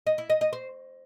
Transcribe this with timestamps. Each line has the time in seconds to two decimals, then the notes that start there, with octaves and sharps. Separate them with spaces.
0.07 D#5
0.18 E4
0.30 D#5
0.41 D#5
0.53 C5